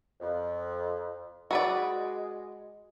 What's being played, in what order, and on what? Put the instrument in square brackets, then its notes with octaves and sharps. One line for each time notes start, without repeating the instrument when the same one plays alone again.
[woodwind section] F2
[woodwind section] G#3 [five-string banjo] F#4 B4 D5